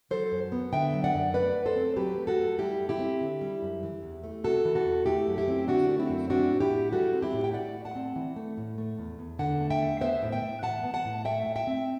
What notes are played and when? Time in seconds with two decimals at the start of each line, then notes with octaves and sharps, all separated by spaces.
0.11 F#3 A4 C5
0.32 F#2
0.52 B3
0.73 D3 E5 G5
0.94 F#3
1.04 D5 F#5
1.14 F#2
1.34 A3 B4 D5
1.56 F#2
1.66 A4 C5
1.76 C4
1.96 F#3 G4 B4
2.18 A3
2.27 F#4 A4
2.39 F#2
2.58 G3 E4 G4
2.80 F#2
2.89 E4 G4
2.99 C4
3.21 D3
3.41 G3
3.62 F#2
3.83 E3
4.03 E2
4.24 A3
4.44 C3 F#4 A4
4.65 E3
4.75 F#4 A4
4.85 E2
5.06 A3 E4 G4
5.27 F#2
5.38 E4 G4
5.48 C4
5.68 D3 D4 F#4
5.89 A3
5.99 C4 E4
6.09 F#2
6.30 C4 D4 F#4
6.51 A2
6.60 E4 G4
6.71 A2
6.92 G3 F#4 A4
7.13 C4
7.22 E4 G4
7.33 A2
7.44 G5
7.54 A3 D5 F#5
7.75 A2
7.85 F#5 A5
7.95 C4
8.16 E3
8.36 A3
8.57 A2
8.78 A3
8.99 E2
9.19 E2
9.39 D3 F#5 A5
9.61 A3
9.70 E5 G5
9.82 E2
10.01 B3 C5 E5
10.23 A2
10.32 E5 G5
10.42 A2
10.63 E3 F#5 A5
10.83 B3
10.94 F#5 A5
11.05 A2
11.25 A3 E5 G5
11.47 A2
11.56 E5 G5
11.67 C4